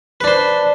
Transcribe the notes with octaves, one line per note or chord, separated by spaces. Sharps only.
D4 B4 C5